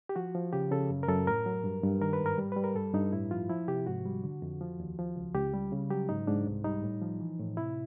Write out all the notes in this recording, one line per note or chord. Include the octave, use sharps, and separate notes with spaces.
G4
F3 F#4
F3
C#3 G4
C#3 A4
F#2
A#4
F#2 A4
A2 A#4
F#3
G2
G2
D#3 A#4
B4
G#2
A#4
G3
G3 B4
A#4
G2 A4
G2 D#4
A2 E4
F3 F4
F3 E4
C3 G4
G#2 F#4
G3
D3
F2
F3
D#2
F3
C#2
C#2 G4
G3
C#3
F#3 G4
G#2 D#4
G#2 D4
C2
G3 D#4
A2
F3
E3
A2
C3 E4